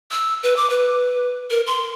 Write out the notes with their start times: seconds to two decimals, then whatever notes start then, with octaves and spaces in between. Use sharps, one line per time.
0.11 E6
0.43 B4
0.56 D6
0.70 B4
1.50 A#4
1.66 C6